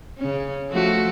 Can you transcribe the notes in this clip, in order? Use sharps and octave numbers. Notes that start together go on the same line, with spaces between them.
C#3 C#4
F3 A3 F#4